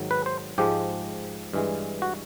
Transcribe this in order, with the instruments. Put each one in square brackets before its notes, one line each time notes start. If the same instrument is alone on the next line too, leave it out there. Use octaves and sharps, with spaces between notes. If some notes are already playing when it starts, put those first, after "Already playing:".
Already playing: [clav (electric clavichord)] G#2 D#3 F#3
B4
C5
G#2 F3 G#3 G4
G2 E3 G#3
F#4